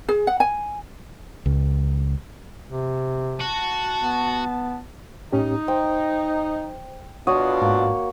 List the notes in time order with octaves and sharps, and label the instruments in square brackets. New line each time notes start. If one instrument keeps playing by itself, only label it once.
[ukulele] G#4
F#5
G#5
[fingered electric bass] C#2
[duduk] C3
[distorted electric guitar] F#4 [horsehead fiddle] A5
[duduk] B3
[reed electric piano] A2 C#4 G4 [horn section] D#4
[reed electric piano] C5 [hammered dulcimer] G5
[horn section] B2 D4 F4 [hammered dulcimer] F#4 C#5 F#5 [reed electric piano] D#6
[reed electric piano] G#2 [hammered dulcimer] A#3